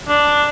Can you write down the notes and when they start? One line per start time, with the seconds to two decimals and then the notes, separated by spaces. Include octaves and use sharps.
0.08 D4